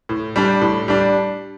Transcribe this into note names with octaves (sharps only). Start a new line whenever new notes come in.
A2
G3 D4
A2
G3 D4